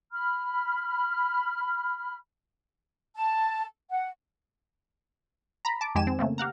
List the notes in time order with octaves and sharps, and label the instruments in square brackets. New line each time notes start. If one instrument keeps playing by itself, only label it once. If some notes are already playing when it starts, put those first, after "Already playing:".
[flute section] B5 F6
A5
F#5
[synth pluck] A#5 B5
A5 D6
F2 D#3 G#3 G4 G#5 E7
C4
C#3 A3 A#3 C4
G4 F5 F#5 A#5